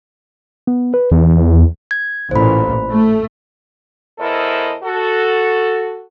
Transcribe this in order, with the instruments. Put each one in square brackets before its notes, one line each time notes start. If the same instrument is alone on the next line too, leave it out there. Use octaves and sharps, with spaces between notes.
[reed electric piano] B3
B4
[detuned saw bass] E2 [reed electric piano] E3
[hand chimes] G#6
[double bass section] A1 A#2 [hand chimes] C5 B5
[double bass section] A3
[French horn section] E2 E4 A4 A#4 C5 D#5
F#4 A4